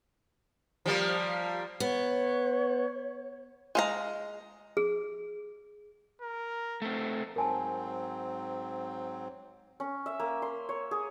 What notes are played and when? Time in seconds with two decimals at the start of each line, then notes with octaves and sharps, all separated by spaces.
0.86 F3 G3 A#3
1.80 B3 C#5
3.75 G#3 F5 A#5
4.77 G#4
6.22 A#4
6.82 A3 C4
7.36 G#2 F#3 C4 A#4 G#5 A5
9.80 C#4
10.06 E5
10.20 A#3
10.42 C6
10.69 C#5
10.91 G#4